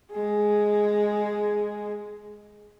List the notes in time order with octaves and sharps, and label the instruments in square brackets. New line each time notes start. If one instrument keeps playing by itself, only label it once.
[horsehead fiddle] G#3 G#4